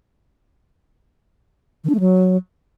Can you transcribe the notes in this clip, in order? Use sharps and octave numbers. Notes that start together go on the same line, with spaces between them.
D#3
D4
A3
F#3